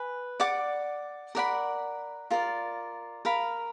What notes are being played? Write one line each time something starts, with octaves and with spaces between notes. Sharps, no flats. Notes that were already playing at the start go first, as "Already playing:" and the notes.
Already playing: B4 G#5
D5 F#5 D6
A#4 D5 F#5 B5
F4 A#4 D5
A#4 F5 B5